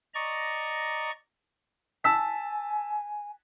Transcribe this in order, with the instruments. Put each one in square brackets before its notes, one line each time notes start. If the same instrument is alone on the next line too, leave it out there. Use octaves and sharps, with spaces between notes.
[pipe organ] D5 D#5 A#5 C#6
[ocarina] G#5 [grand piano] A5 E6 B6